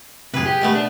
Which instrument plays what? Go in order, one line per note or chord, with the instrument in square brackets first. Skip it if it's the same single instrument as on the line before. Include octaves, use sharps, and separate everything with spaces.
[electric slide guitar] F#2 C3 [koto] G#4 B4
[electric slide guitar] G4
[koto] B2 A3 B3
[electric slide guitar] D4